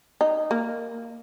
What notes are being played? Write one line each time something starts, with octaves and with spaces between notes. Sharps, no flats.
D#4
A#3